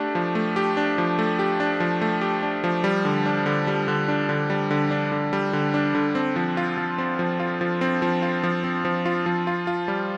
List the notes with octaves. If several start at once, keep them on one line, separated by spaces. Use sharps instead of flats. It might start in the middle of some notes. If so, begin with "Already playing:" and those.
Already playing: A3 D4 G4
F3
A3
G4
D4
F3
A3
G4
D4
F3
A3
G4
D4
F3
G3
D3
D4
D3
G3
D3
D4
D3
G3
D3
D4
D3
G3
D3
D4
D3
C4
F3
F4
F3
C4
F3
F4
F3
C4
F3
F4
F3
C4
F3
F4
F3
F4
F4
G3